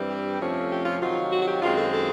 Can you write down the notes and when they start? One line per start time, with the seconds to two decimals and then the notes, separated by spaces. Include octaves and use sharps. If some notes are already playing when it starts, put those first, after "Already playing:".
Already playing: G2 E3 G3 C4
0.09 G4
0.40 F2 C3 F3 A3 C#4
0.71 G4
0.85 F4
1.01 C3 D#3 F#3 F4
1.32 F#4
1.42 F#4
1.47 G4
1.62 F#2 D#3 G#3 C4 F4
1.77 A4
1.93 A4